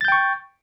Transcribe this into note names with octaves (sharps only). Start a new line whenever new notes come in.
G5 C#6 G6 A6